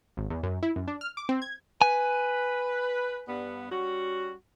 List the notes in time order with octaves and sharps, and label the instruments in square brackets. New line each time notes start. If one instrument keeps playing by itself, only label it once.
[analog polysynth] G#1
E2
F#2
E4
F#2
D4
F6
D6
C4
G#6
[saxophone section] B4 [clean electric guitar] G#5
[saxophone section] G2 B3
G3 C#4 F#4